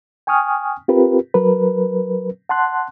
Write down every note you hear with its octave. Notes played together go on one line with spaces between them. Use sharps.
G5 G#5 C#6 D#6 F6
C4 F4 G4 A#4 B4
F#3 A#4 B4
F#5 A5 C6 F#6